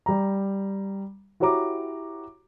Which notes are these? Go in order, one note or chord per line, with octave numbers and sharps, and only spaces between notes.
G3 A#5
E4 F#4 G4 C#5 A#5 D6